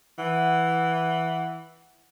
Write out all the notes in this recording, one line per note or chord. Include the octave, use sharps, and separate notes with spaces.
E3 F#5